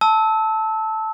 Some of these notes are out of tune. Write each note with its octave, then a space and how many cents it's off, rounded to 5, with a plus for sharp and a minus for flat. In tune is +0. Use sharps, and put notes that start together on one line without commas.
A5 +0 E6 -25